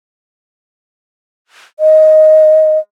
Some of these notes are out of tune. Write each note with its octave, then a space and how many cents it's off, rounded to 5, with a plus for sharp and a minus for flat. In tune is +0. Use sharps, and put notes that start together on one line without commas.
D#5 +5